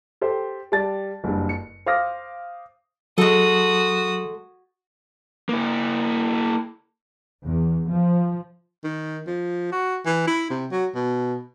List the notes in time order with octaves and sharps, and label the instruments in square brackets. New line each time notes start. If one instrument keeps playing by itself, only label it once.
[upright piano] G4 A4 C5
G3 D5 A5 A6
F#1 G2
C#7
C5 F5 D6 D#6 F6 A#6
[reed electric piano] F#3 [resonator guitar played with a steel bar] G#3 A4 [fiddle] F#4 D#6
[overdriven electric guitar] A#3 E4
[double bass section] E2
F3
[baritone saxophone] D#3
F3
F#4
E3
E4
C3
F#3
B2